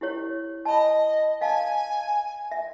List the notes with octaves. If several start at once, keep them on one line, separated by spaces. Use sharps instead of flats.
E4 G4 C#5
D#5 A5 B5
D#5 F5 G#5 A5
E5